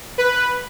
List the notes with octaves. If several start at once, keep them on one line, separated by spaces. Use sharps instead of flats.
B4